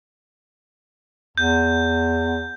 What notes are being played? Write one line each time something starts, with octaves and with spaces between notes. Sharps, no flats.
E2 G6